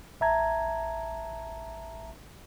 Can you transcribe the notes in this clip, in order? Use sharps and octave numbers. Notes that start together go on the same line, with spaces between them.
A1 E5 A5 A#5 G#6